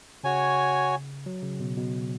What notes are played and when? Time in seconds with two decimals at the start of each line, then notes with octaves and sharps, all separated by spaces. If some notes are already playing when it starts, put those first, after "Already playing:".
0.24 C#3 F#4 C#5 G#5
1.26 F#3
1.43 C#3
1.60 B2
1.77 B2